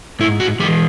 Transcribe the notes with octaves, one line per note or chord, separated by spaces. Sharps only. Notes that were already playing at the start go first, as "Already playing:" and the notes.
G#2 E4
F#4
E3 G#3 G4